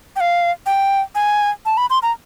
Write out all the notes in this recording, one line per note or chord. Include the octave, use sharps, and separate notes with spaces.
G5
F5
G5
G#5
A5
B5
C6
A#5